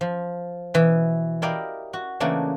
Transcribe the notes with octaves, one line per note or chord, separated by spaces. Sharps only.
F3
B2 E3
E4 G4 A#4 D5 D#5 F5
F#4
C#3 E3 A3 A#3 D4